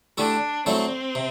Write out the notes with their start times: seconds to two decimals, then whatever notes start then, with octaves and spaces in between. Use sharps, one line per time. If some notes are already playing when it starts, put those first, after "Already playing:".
0.17 D3 A3 D4 E4 G4
0.66 D3 F#3 A3 C4 E4 A4
1.15 C3